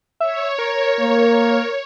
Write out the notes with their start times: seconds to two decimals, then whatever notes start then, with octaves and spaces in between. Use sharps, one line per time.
0.20 C#5 E5
0.59 A#4
1.00 A#3